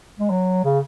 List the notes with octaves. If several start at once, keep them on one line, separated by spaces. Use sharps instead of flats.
G#3
F#3
C#3